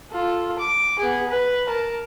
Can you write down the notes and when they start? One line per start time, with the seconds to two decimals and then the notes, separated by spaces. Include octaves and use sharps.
0.11 F4 A4
0.58 D6
0.99 B3 G#4
1.29 B4
1.67 A#4 A5